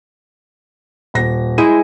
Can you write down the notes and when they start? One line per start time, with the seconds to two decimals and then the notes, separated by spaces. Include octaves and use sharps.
1.14 D#1 A#6
1.58 G#3 E4 G#4 C5 D#7